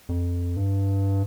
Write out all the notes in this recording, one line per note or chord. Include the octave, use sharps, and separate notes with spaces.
F2
G2